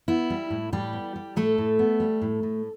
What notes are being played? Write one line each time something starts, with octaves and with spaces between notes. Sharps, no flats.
B3 E4
G3
A2
A2 G3 G4
B3
G3
A2 A3 A4
A2
B3
G3
A2
A2